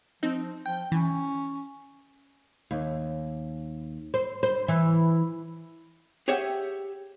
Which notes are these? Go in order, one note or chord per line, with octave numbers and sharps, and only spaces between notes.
F3 C4 D#4
F3 G5
E3 C#4
D#2
C5
C5
E3
G4 G#4 C#5 E5 F#5 G5